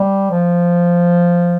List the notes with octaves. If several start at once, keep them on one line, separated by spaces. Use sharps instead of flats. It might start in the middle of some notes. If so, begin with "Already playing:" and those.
Already playing: G3
F3